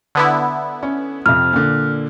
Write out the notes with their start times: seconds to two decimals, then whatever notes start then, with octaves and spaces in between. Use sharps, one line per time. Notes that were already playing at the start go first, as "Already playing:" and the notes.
0.15 D3 B3 E4
0.83 C#4
1.26 F2 C3 F6
1.53 A#2 D3